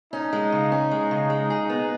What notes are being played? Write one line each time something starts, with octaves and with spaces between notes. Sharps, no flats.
C#4 D#4
G#3
C#3
C#4
G#3
C#3
G#3
G#4
B3